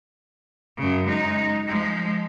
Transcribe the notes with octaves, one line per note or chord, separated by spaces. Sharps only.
F#2 C#3
G#3 D#4
F3 G#3